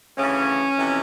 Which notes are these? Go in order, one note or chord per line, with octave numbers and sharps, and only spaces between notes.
D2 C#3 E3 C#4
F2 C3 E3